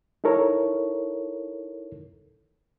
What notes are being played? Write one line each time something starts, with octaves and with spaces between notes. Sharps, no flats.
D#4 E4 A4 A#4 C#5